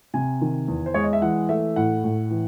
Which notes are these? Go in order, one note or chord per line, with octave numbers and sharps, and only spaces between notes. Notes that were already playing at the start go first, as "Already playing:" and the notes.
C3 G#5
D#3
E2
C5
G#3 C#5
D#5
E5
E3 F#5
A3 E5
A2 F#5
A2
E3